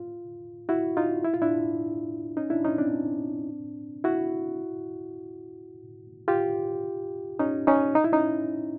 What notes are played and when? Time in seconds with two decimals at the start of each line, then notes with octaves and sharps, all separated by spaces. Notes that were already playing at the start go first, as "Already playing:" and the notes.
Already playing: F4
0.69 E4 F#4
0.97 D#4 F4
1.24 E4
1.34 F4
1.42 D4 E4
2.37 C#4 D#4
2.50 D4 E4
2.64 C#4 D#4
2.78 C4 D4
4.04 E4 F#4
6.28 F4 G4
7.39 C#4 D#4
7.67 C#4 D#4
7.95 D#4
8.04 E4
8.13 C#4 D#4